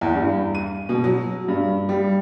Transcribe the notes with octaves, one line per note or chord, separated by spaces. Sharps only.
E2
G2
D#7
B2
F#3
G2
G3